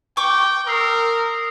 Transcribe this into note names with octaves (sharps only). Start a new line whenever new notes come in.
G5 C#6 D6
A#4 D#6 E6 C7